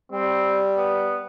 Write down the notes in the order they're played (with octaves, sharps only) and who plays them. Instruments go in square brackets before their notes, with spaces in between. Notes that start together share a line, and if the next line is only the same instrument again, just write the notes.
[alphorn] G3 [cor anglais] C4
[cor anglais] B3